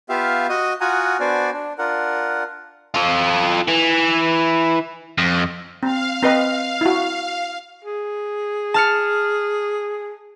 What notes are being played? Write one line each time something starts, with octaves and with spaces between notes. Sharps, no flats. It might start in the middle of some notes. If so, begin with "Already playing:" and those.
B3 F4 G4 E5 F5
F#4 D#5 D#6
F4 F#4 F#5 G#5 A#5 D#6
B3 D4 F#4 C5 D5 G#5
D4
D4 F4 A#4 F#5
F4 A4
E3
F2
C4 F5
C4 B4 D#5
E4 F#4
G#4
A5 F6 C#7